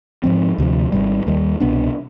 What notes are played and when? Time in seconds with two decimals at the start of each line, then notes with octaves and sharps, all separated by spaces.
0.24 G#2 F3 C4
0.58 D2 C3 F3
0.92 G#1 G#2 G3
1.27 D#2 D#3 G3
1.60 C2 B2 B3 D4